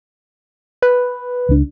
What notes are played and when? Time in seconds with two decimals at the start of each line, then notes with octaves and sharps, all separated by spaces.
0.82 B4
1.49 C#2 D4